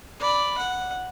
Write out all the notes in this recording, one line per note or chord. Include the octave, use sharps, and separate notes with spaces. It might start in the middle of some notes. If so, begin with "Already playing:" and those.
D5 B5
F#5